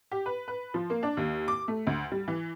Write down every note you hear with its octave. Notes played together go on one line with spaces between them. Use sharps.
G4
B4
B4
F3
A#3
D4
D#2
D6
A3
D2
G3
E3